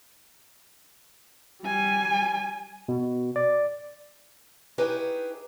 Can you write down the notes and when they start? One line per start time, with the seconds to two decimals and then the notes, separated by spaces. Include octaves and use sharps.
1.63 G3 G#5
2.88 B2
3.36 D5
4.78 D#4 E4 G4 G#4 B4 C#5